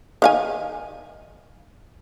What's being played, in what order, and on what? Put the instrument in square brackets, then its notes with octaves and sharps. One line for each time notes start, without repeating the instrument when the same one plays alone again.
[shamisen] D#3 F5 G#5